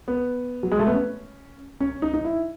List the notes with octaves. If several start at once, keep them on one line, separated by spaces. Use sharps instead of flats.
B3
F#3
G#3
A3
B3
C#4
C#4
D#4
D#4
E4